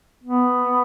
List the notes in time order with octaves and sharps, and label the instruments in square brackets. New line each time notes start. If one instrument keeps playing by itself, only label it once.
[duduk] B3